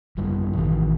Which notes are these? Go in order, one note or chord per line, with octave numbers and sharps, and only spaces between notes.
F#1 G3
A1 A2 D#3 E3